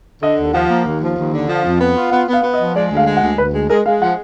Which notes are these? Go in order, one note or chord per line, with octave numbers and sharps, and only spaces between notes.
D3 D#5
D#2
F3 F#5
A#3
D#2
F3
D#2
D3
F3
F2
B3
F4
B3 F#5
B3 F5
B3
D#5
F3
G#3 D5
D2
F5
G#3
F#5
D2
D2 B4
G#3
G#3 A#4
G#3 F5
F3 F#5